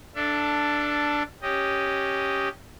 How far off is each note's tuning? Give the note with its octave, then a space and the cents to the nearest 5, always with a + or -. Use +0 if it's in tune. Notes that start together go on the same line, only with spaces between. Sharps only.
D4 +0 A4 +0 E5 +35
C#4 +0 G4 +0 D#5 +0